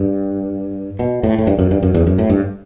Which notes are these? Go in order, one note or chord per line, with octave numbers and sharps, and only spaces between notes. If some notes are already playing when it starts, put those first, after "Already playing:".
Already playing: G2
B2
A2
A2
G2
F#2
G2
F#2
E2
F#2
A2
G2